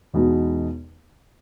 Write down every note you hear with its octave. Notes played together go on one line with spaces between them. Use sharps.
E2 B2 G#3 B3 D#4